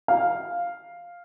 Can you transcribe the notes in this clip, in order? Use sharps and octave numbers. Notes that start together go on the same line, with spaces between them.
F5